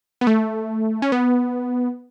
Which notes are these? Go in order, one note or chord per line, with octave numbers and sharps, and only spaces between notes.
B3
A3
C#4
B3